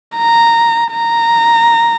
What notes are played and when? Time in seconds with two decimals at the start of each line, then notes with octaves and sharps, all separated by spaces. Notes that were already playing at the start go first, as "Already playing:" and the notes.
0.17 A#5
0.92 A#5